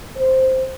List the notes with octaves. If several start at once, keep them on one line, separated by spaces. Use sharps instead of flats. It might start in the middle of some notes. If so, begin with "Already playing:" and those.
C5